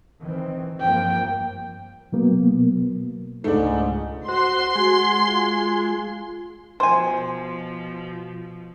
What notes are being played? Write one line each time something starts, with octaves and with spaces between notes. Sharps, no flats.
D#3 E3 C4
G2 F3 A#3 G5
B2 F#3 A#3 B3
C#2 G#2 A3 D4
F#4 C5 C6
G#3 F#4
F4
B2 F3 C5 G#5